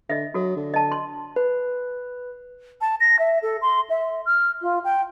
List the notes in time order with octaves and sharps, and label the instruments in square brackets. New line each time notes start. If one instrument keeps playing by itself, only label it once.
[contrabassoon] D3 [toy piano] D#5 E5
[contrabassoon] F#3 [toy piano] F#4 A4
[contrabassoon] D3
[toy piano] D#5 A5
C6
[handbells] B4
[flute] A5
A#6
E5
A4
C6
E5
F6
F4
G5